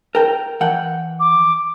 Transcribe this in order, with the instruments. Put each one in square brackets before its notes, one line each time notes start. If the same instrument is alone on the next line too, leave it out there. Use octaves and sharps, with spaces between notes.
[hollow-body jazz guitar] A#4 G5
E3 F#5 G5
[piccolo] D6